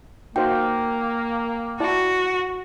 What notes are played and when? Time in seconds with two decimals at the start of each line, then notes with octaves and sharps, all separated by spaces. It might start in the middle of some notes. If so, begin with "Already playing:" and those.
0.36 A#3 D#4 F#4 C5 G5
1.80 E4 F#4 D5 A5